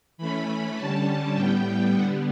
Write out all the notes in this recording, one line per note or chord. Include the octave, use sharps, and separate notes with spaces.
E3 A3 C#4 B5
D3 G3 C#4 A5
A2 G3 B3 G5
D3 G3 B3 F#5